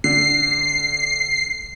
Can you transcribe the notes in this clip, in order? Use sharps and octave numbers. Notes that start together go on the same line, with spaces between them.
D3 C7